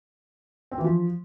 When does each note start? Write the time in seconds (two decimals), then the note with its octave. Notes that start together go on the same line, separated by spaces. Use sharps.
0.72 C4
0.78 E3
0.84 F3